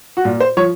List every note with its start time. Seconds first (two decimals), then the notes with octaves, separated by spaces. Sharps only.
0.17 F#4
0.24 A#2 F4
0.40 C5
0.57 F3 C#5